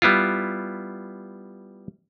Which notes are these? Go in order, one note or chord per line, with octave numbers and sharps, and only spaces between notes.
G3 B3 E4 F4